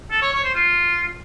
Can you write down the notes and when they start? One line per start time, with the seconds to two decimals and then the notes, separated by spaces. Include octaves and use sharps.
0.11 A4
0.22 C#5
0.33 C#5
0.44 C5
0.55 F4